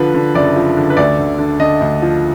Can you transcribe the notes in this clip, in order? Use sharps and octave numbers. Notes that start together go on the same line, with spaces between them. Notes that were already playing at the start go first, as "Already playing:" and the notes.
Already playing: D3 F3 B4
D3
F#1 D5
F3
D3
B4
D2 D5
D2
D3
D3 D#5
D2
F3